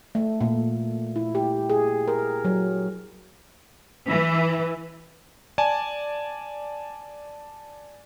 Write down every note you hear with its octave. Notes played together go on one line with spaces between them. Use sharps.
A3
A#2
E4
G4
G#4
A#4
F#3
E3
D5 G#5 A5